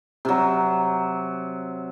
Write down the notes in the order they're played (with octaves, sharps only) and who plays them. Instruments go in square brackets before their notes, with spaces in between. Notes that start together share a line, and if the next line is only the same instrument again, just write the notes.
[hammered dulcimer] C3 F#3